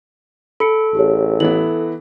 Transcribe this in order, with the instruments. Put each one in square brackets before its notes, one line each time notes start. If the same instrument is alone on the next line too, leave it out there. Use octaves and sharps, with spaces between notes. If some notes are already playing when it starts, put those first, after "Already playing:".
[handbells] A4 [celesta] B5 C#7
[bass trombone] A1 [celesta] G4 G#4 C#5
[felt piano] E3 B3 E4 [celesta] F#7